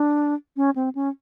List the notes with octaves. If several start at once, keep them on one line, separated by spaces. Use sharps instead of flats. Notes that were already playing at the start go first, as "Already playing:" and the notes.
Already playing: D4
C#4
C4
C#4